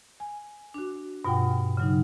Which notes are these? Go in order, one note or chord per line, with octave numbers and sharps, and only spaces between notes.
G#5
D4 F#4
G2 B2 F4 F#5 G5
C#3 F#3 D#4